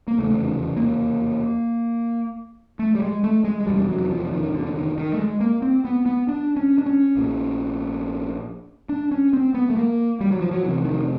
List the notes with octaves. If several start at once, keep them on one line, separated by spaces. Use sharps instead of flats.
A#3
F1 E2 C#3 A3
A#3
A3
G3
G#3
A3
G#3
G#3
F1 E2 B2 G3
F#3
F3
D#3
D3
D#3
D#3
A3
G#3
A#3
C4
B3
B3
D4
C#4
D4
C#4
A#1 A#2
D4
C#4
C4
B3
A3
A#3
G3
F#3
F3
F#3
F1 F2 C3 E3
D#3